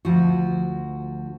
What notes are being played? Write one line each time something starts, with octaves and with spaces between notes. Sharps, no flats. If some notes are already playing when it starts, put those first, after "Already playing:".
D2 F3 F#4